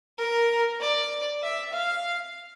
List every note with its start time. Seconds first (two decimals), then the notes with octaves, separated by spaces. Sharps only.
0.18 A#4
0.80 D5
1.42 E5
1.72 F5